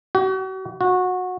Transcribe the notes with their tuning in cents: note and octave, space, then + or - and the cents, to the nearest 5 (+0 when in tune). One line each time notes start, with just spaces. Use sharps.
F#4 +40
F#4 -20